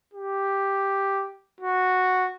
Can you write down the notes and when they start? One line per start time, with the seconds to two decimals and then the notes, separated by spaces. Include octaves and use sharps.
0.14 G4
1.61 F#4